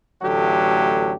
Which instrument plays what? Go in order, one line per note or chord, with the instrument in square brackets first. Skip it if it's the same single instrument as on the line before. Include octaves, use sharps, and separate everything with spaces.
[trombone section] A1 D3 F#3 A3 G4